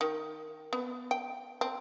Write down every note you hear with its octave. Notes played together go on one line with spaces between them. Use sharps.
D#3
B3
G5
C4